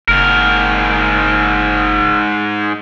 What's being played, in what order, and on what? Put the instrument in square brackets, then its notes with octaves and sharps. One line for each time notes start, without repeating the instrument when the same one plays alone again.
[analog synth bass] F#1 [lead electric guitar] G#2 A#4